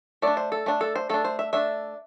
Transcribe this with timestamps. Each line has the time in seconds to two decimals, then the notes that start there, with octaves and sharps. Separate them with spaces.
0.22 A3 D4 D5
0.37 C5
0.52 A4
0.66 A3 D4
0.81 A4
0.96 C5
1.09 A3 D4 A4
1.24 C5
1.39 E5
1.53 A3 D4 E5